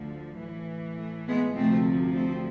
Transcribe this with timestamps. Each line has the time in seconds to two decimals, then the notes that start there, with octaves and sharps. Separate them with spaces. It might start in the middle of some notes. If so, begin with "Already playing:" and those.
Already playing: D2 D3 F3
0.37 A2 E3
0.97 A3
1.26 G#3 B3
1.56 D2 C3 F3 A3 C4
2.14 A3 C4